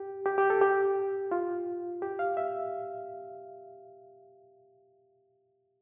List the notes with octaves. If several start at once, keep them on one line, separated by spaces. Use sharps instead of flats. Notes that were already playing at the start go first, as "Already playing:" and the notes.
Already playing: G4
G4
G4
A4
G4
F4
G4
F5
E5